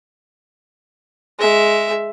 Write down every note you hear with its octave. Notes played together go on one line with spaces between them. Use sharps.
G#3 E5